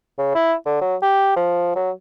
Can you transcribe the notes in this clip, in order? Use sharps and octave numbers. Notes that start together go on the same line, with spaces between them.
C#3
E4
D3
F#3
G4
F3
F#3